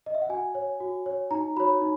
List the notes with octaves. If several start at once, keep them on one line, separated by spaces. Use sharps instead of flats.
D#5
E5
F#5
F#4 G#5
C#5
F#4
C#5
D#4 A#5
F#4 C#5 B5
D#4